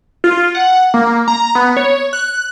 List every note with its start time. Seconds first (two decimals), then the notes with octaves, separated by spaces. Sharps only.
0.24 F4
0.55 F#5
0.94 A#3
1.28 A#5
1.55 B3
1.77 C#5
2.13 F#6